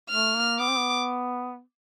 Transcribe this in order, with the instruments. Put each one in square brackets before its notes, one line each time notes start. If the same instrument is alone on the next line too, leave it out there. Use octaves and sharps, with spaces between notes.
[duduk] A3 [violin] F6
[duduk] A#3
[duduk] B3 [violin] D6
[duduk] C4
B3